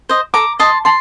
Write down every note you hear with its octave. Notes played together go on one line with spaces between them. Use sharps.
C5 D#5
A4 A#5 D6
D#5 A5 C6
A5 C6